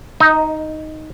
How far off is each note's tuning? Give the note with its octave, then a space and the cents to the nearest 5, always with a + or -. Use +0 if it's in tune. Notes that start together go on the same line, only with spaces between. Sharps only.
D#4 +0 D#5 +25